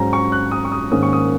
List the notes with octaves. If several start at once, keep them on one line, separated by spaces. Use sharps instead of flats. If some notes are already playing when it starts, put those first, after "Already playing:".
Already playing: G#2 F#3 C#4 A#5
C#6
F#6
D#6
C#6
D#6
G#2 D#3 A#3 C#4 D#6
C#6
D#6